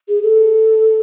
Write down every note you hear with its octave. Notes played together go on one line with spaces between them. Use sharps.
G#4
A4